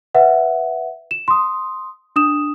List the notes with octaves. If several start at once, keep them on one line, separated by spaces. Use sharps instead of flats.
B4 E5 F#5
E7
C6 D#6
D4 D#6 E7